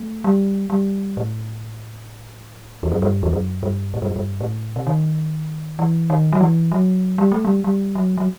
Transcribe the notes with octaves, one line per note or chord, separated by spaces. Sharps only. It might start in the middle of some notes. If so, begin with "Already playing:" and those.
Already playing: A3
G3
G3
A2
E2
F#2
G2
E2
F#2
G2
A2
G2
F#2
G2
A2
C3
D#3
E3
D#3
F#3
E3
F#3
G3
A3
G3
G3
F#3
F#3